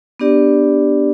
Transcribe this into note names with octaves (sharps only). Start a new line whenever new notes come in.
B3 D4 G4 D5